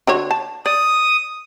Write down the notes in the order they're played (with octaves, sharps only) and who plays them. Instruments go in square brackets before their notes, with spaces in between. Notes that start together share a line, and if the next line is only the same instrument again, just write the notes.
[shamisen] D3 F#4 C#5
A5
[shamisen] D5 [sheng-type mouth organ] D#6